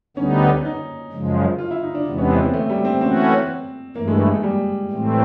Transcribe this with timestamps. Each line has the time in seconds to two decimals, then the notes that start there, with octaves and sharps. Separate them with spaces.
0.17 D2 D3 G3 B3 C#4 D#4
0.65 D#4
1.12 F#2 C#3 F3 G#3
1.58 F4
1.71 E4
1.83 D#4
1.95 D4
2.06 E2 C3 E3 G#3 B3
2.18 C#4
2.31 C4
2.42 B3
2.54 A3
2.70 G3
2.85 C4
3.01 E3 A3 C4 C#4 F#4
3.95 G2 E3 A3 A#3
4.08 G#3
4.20 G#3
4.31 G#3
4.43 G3
4.91 A2 E3 A3 C4